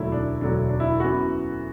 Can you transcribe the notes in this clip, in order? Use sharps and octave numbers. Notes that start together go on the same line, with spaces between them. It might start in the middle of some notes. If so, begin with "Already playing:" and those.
Already playing: E1 D2 D3 F#3 A3 E4
D4
E1 D2 D3 F#3 A3 D4
D4
E4
F#2 E3 B3 F#4